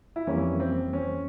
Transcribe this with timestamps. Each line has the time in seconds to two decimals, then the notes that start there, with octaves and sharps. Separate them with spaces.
0.16 E4
0.27 F2 E3 G3 A#3 C#4
0.60 C4
0.93 C#4